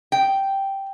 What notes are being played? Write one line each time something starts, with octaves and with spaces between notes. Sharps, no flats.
G5